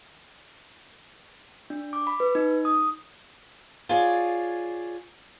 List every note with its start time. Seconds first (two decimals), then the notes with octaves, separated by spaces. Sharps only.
1.70 D4
1.93 D6
2.07 B5
2.20 B4
2.35 D#4
2.65 D#6
3.89 F4 G#4 C#5 D5